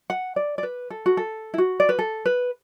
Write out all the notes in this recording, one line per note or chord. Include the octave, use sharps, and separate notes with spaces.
F#5
D5
D5
B4
A4
F#4
A4
E4
F#4
D5
B4
A4
B4